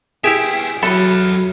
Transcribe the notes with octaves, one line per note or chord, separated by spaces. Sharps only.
B3 E4 G4 G#4 E5 G5
F#3 F#4 A4 E5 B5